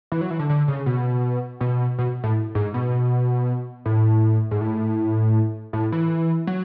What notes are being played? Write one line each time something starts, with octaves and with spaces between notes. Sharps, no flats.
E3
F#3
E3
D3
D3
C#3
B2
B2
B2
A2
G#2
B2
A2
G#2
A2
A2
E3
F#3